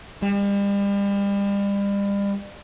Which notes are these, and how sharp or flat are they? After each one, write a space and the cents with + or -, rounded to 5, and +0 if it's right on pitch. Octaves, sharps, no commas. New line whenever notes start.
G3 +40